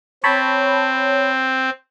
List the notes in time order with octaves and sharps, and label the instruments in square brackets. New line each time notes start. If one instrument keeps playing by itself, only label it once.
[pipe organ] C4 [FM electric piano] C#5 A5 B5